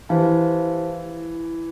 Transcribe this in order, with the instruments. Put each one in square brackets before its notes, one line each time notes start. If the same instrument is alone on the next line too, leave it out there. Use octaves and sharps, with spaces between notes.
[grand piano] E3 [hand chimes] G4 C5 F5 A5